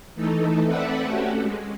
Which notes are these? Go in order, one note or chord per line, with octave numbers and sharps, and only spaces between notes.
E3 A3 D#4 A4
C4 A4 B4 D5 E5 F#5
A3 C#4 F#4 G4 A4
G#3